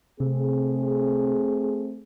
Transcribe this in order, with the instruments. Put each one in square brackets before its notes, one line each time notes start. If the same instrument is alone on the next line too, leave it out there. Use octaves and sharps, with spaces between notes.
[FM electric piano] C3 [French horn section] A3 C4 G#4